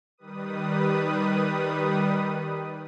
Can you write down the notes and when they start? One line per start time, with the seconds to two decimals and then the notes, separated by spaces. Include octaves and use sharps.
0.18 D#3 G3 B4 D#6